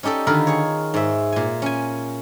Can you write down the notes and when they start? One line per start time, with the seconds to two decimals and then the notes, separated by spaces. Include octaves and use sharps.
0.03 C#4 D#4 G4 A4 D5
0.27 D3 D#3 F4 A#4 B5
0.47 G#4 C#5
0.94 G#2 E5
1.32 A#2 G#5
1.62 C#4 G#5